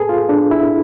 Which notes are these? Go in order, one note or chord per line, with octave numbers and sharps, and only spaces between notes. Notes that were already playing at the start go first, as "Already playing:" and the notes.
Already playing: G#4 A4 B4
F4
D4
E4